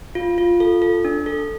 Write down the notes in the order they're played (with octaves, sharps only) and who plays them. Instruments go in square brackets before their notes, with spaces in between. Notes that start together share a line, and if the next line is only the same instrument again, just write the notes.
[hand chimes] F4
F4
A4
A4
D4
A4